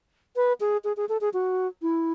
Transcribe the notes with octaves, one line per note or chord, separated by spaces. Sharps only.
B4
G#4
G#4
G#4
A4
G#4
F#4
E4